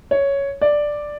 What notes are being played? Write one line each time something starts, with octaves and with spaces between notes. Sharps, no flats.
C#5
D5